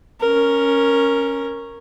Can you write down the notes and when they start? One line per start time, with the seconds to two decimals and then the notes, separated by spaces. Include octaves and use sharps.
0.21 C#4 A#4